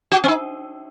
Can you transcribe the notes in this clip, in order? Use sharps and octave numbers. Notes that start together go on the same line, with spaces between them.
F#4
C4
D#4